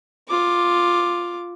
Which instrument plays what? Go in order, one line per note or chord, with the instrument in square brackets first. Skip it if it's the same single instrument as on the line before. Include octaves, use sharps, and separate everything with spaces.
[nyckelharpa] F4 D6